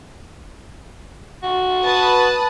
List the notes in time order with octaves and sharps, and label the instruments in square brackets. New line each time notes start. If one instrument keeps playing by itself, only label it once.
[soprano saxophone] F#4
[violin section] B4 A5 D#6